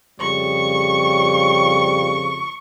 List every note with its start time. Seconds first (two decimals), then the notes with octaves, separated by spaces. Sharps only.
0.20 F2 C#3 G3 C#6